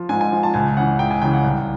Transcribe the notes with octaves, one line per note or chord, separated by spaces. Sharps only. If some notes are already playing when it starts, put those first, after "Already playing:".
Already playing: F3
G#2 G#5
G#5
F3
A5
C#2 G#5
C#3 E3 F#5
C#2 G5
G#5
C#3 E3 G5
F#5
C2